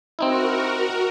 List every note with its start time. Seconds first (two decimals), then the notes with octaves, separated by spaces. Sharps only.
0.19 C4 D#4 E4 F#4 A#4